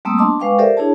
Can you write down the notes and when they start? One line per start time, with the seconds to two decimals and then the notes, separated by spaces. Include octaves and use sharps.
0.05 G3 A3 A#3 C4 D#6 E6
0.18 B3 D4 D#5 A5 C6 D6
0.40 G#3 B4 F5 G5 C#6 D6
0.58 G4 A4 A#4 C5 D5 E5
0.77 D4 E4 G#4 C#5 A5